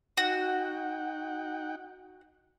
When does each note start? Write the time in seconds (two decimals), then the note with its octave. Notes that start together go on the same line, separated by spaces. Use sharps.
0.17 D#4 F#4 F#5 G5